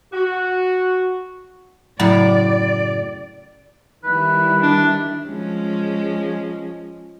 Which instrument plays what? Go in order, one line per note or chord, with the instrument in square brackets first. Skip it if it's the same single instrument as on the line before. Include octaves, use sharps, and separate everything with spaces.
[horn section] F#4
[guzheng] F#2 A2 C#3 [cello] D5
[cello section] D#3 G3 E4 [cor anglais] B4
[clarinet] D4
[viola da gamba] F3 G#3 C#4